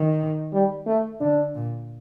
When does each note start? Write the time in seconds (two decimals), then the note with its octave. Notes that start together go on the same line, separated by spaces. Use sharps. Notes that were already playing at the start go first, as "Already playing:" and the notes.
Already playing: D#3
0.53 G3
0.87 A3
1.20 D3 D4
1.55 A#2